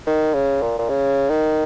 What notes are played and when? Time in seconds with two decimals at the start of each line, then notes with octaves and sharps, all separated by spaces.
0.07 D#3
0.34 C#3
0.62 A#2
0.79 A#2
0.89 C#3
1.30 D#3